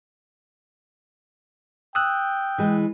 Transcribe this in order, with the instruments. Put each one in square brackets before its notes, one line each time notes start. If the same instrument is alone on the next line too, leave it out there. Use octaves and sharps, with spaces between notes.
[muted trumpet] G5 [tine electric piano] D#6 E6 F#6
[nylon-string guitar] E3 G#3